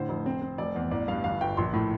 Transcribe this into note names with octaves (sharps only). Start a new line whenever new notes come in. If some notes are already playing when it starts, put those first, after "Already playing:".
Already playing: A2 D3 C5
F1
C4
C4
F1 D5
E2
A1 D5
G2 F5
G1 F5
G1 G5
A#1 C6
A2